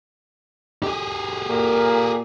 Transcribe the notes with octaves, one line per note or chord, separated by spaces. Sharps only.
G4 G#4
A#2 A#3